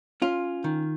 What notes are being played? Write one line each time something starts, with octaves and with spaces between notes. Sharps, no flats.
C#4 F4
D#3